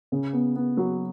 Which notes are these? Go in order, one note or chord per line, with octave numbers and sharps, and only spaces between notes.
C#3
B3
B3
F#3